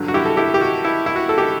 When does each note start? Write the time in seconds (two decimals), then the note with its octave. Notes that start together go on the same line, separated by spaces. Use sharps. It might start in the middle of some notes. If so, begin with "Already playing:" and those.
Already playing: G2 D3 F#3
0.08 F#4
0.14 E4 G4
0.26 A4
0.37 E4 G4
0.54 G4
0.61 F#4
0.85 E4
1.06 E4
1.16 F#4
1.29 A4
1.38 G4